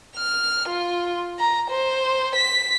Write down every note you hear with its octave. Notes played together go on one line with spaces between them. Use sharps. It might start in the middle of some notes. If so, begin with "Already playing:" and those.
F6
F4
A#5
C5
B6